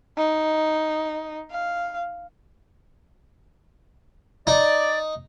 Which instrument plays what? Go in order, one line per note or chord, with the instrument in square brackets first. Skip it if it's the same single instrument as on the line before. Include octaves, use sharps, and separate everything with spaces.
[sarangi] D#4
F5
[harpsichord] D#4 [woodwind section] D5